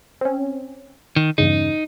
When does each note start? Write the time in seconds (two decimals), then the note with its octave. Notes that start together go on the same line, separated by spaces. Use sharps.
0.21 C4 C#4
1.16 D#3
1.38 E2 G2 C#3 D#4